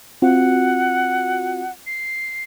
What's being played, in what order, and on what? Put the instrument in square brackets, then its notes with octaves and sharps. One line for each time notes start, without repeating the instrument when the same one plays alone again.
[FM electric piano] C4 F4 F#4 [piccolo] F#5
[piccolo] C7